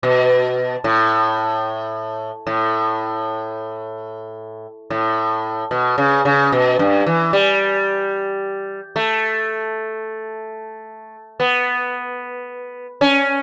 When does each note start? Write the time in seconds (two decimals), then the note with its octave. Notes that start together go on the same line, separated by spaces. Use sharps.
0.03 B2
0.84 A2
2.47 A2
4.90 A2
5.71 B2
5.98 C#3
6.25 C#3
6.52 B2
6.79 G2
7.06 E3
7.33 G3
8.96 A3
11.40 B3
13.01 C#4